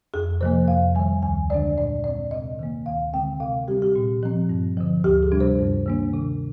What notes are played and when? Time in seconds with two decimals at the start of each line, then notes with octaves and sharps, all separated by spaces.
0.14 F2 G#4
0.41 C3 F3 A#3 C5
0.68 F2 F5
0.95 D#3 G3 G#5
1.22 D2 G#5
1.50 D3 G#3 D4 D5
1.77 A#2 D5
2.04 G#3 C4 D5
2.31 C3 D#5
2.59 D#3 A#3
2.86 D2 F5
3.13 D3 G#3 C4 G5
3.40 C3 F5
3.68 G3 G4
3.71 C4
3.82 G4
3.96 A#2
4.23 F3 C4
4.49 G2
4.77 D3 F3
5.04 D2 G4
5.23 G#4
5.32 C3 G3 D4
5.40 C5
5.59 G2
5.86 D#3 A#3 D4
6.13 C3